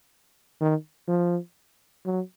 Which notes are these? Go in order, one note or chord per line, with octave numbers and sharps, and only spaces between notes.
D#3
F3
F#3